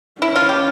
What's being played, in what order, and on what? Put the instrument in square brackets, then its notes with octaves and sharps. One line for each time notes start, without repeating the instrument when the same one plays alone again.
[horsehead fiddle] C#4 [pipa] E4
[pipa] F4
G4